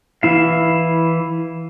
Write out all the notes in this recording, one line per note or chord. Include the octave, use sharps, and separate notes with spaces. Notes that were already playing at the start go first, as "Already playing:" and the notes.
E3 E4 F5